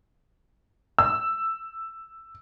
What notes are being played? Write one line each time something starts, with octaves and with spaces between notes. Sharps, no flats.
E6